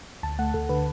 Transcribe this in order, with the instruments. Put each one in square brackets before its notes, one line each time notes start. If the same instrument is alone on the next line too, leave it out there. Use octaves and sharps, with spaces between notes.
[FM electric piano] D2 A5
A3 F#5
D2 A4
D3 B4